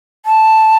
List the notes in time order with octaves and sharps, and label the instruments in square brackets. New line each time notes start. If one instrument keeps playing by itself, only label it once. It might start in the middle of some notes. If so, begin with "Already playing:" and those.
[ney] A5